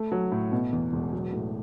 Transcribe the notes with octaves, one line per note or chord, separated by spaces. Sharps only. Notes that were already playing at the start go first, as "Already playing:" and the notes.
Already playing: A3
F#3
A2
B2
E2
E1
F#3
A2